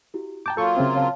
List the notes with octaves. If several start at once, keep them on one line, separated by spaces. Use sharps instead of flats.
E4 F#4 G4
G5 A5 A#5 D6 G6
F#3 A#3 F4 A4 C#6
C#3 C4 E5
C#5 F5 A5